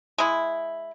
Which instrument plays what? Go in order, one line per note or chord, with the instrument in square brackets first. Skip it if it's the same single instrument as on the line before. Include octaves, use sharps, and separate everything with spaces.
[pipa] G#3 E4